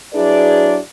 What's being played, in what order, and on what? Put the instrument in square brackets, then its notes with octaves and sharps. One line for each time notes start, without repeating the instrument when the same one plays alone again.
[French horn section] F#3 D4 E4 G#4 B4 D5